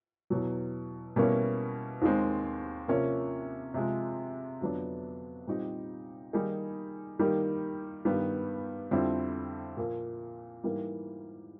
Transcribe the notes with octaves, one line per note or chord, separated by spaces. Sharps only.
E2 B2 F#3
B2 G3 A#3 C#4 E4
D#2 D#3 G#3 C4
C3 F3 A#3 C#4
C3 F3 G#3
F2 D3 F#3 B3 D4
A#2 G3 C4 D#4 G4
D#3 G3 A#3 D#4 G#4
D#3 G3 A#3 D#4 G4
G2 D#3 G3 B3
F2 D3 G3 C4 E4
A#2 F3 A#3
G#2 E3 G3 A#3